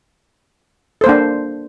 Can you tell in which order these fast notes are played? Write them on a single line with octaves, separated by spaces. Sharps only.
A4 C5 A#3 D4